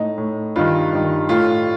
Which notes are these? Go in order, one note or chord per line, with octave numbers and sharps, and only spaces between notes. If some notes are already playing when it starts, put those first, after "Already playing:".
Already playing: A2 D#4
A2
G2 D#3 F4
G2 D#3
A2 F4